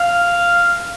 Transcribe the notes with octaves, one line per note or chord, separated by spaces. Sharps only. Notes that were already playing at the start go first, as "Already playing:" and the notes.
Already playing: F5